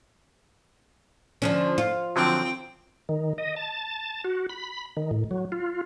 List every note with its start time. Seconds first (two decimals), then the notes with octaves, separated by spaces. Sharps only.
1.42 D3 F3 C#4
1.78 F4
2.16 D3 F3 F#3 C4 G5
3.09 D#3
3.38 D#5
3.56 A5
4.24 F#4
4.49 B5
4.97 D#3
5.11 A2
5.31 F#3
5.52 F4